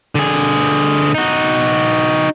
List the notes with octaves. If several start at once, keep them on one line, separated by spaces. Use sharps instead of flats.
D3 G#4
D#4 F#4